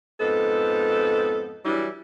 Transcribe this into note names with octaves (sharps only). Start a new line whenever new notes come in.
F2 G#2 B3 A4
E3 F#3 G3 D4 E4